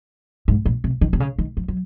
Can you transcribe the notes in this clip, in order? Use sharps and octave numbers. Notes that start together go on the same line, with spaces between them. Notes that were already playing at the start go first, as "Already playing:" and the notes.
G#2
A#2
C3
D#3
C3
C#3
D#3
F3
F#3